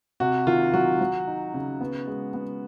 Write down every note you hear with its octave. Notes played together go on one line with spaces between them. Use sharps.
C3 F#4
D#3 F4
F#3 F#4
F#3
D#4
C#3
B3
G#3
B3